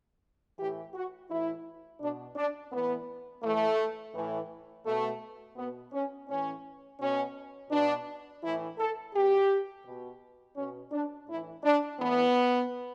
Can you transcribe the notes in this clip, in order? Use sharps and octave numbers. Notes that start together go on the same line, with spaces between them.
A2 E3 G4
F#4
A2 E3 E4
B2 D4
D4
A2 E3 B3
A2 E3 A3
A2 E3
B2 A3
B2 B3
C#4
A2 E3 C#4
B2 C#4
B2 D4
A2 E3 E4
A4
B2 G4
B2
B2 C#4
D4
A2 E3 E4
D4
A2 E3 B3